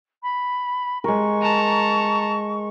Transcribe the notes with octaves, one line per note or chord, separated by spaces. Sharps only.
B5
G#3 A#4 C#6
A5 A#5